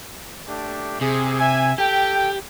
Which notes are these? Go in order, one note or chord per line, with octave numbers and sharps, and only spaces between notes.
A3 D4 G4
C3 G#4
E5 G#5
G4 A4 G5